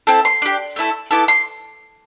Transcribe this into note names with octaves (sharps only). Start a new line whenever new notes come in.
C4 E4 A4
C6
D4 G4
A3 E4 A4
B3 E4 A4 D6
C6